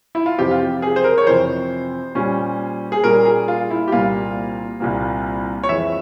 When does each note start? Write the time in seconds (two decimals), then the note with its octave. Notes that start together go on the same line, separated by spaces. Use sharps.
0.15 E4
0.26 F4
0.38 F2 C3 E3 G4
0.51 F4
0.60 G4
0.82 G#4
0.96 C5
1.04 A#4
1.18 C#5
1.27 F2 C3 E3 C5
2.15 A#2 G3 C#4
2.92 G#4
3.04 A#2 G3 C#4 A#4
3.25 G#4
3.48 F4
3.71 E4
3.88 G4
3.92 C2 A#2 G3 A#3 F4
4.80 C2 A#2 G3 A#3
5.63 C#5
5.69 F2 E3 G#3 E5